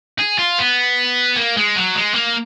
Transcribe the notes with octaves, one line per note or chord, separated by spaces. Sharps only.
G#4
F4
B3
A#3
G#3
F#3
G#3
A#3